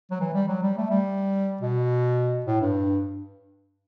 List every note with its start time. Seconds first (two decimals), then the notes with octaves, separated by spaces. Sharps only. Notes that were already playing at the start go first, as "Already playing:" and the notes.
0.11 F#3
0.21 E3
0.34 G3
0.48 F#3
0.62 G3
0.77 A3
0.90 G3
1.61 B2
2.46 A2
2.61 G2